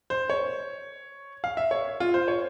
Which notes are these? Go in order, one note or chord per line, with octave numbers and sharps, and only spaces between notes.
C5
C#5
F5
E5
C#5
F4
C5
C#5